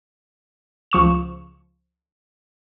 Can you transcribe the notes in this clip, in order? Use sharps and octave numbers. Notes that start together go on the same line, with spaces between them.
C#2 F3 C#6 E7